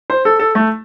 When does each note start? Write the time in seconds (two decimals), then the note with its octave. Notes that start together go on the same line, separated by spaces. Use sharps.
0.10 C5
0.25 A4
0.39 A4
0.55 A3